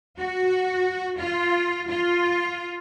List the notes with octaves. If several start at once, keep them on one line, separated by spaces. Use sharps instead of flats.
F#4
F4
F4